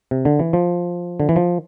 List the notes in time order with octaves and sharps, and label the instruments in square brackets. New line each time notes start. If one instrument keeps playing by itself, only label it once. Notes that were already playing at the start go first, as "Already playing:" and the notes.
[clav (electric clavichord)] C3
D3
E3
F3
D3
E3
F3